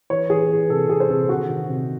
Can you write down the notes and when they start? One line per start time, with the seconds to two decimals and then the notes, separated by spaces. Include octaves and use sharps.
0.10 E3 C#5
0.30 E3 G#4
0.50 E3
0.70 C3 A4
0.90 C3 G#4
1.00 C5
1.10 C3 A4
1.29 D#3 F#4
1.50 D#3
1.69 C3